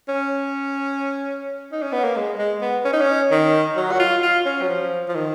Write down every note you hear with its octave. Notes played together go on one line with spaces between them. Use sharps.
C#4
D#4
C#4
B3
A#3
G#3
G#3
B3
C#4
D#4
C#4
D#3
F#3
F#4
F4
F4
C#4
F#3
F3
F3
D#3